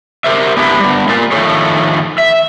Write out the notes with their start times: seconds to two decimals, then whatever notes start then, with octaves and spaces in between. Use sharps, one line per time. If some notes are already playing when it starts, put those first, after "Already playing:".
0.24 G4 A#4 C5 E5
0.57 B3 C4 D4 E4 G4
0.80 G3 B3
1.08 A#3 F4 A#4 D5
1.32 D#3 F3 A3 A#3 A4 C#5
2.18 E5